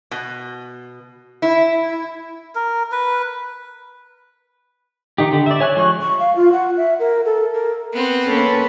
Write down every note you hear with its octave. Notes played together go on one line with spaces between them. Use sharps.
B2
E4
A#4
B4
D#3 D#4 G4
D3 G4
D5 E5
C#5 G#5 F#6
F3 G#3 C#6 F#6
C#6
F5
F4
F#5
E5
A#4
A4
A#4
B3 C4
A#3 C#4 A4 B4